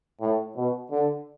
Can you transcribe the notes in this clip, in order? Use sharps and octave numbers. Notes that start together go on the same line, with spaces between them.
A2
B2
D3